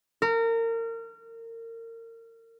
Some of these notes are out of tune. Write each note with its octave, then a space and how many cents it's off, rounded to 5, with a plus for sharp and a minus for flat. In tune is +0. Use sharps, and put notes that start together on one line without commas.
A#4 -30